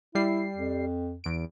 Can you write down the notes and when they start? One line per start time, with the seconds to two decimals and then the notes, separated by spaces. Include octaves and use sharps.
0.15 G3 E4 C7
0.55 F2
1.24 E2 D7